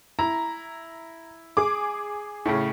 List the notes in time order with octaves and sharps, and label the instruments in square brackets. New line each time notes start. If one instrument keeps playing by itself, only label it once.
[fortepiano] E4 [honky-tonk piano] A#5
[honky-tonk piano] G#4 D6
[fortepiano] A2 C#3